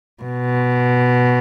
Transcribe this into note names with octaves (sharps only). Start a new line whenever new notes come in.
B2